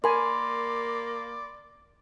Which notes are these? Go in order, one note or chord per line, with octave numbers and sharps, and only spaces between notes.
A#3 A#4 D5 G#5 B5 C6